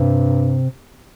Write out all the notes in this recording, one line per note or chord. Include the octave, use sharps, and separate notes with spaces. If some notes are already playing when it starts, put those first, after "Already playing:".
Already playing: G2 C3